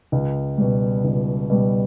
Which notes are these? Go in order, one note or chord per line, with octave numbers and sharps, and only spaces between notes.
C#2
B2 G3
C#2
B2 G3